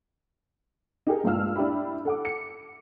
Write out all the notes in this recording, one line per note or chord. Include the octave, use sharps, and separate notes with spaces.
D#4 G4 G#4 A#4
A#1 G2 G#3 F5 E6 F6
D4 E4 G4 B5
A4 F#5 D6
C#7